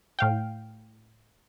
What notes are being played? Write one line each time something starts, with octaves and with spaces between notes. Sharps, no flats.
A2 F5 G5